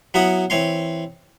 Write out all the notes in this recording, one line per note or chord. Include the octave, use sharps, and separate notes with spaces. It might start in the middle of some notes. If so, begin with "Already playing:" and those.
F#3 B3 E4 F#5 D#6
E3 C4 C#5 C6